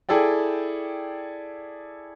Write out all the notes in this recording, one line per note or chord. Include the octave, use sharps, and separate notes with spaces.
E4 G#4 A4 D5 G5